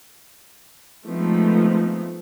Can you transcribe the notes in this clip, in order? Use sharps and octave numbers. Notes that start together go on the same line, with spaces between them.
F3 G#3 A3 B3 C4 D#4